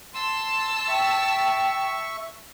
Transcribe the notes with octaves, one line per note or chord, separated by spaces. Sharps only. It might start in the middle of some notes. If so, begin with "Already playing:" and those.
A5 C6 E6
E5 G5 C#6